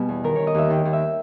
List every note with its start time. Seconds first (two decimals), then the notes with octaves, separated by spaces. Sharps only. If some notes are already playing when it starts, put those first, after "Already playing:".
Already playing: B2 G3 G#5
0.09 E2
0.24 D#3 A#4
0.36 D#3 C#5
0.47 D#5
0.55 D#2 E5
0.70 D#3 G5
0.85 D#2
0.93 E5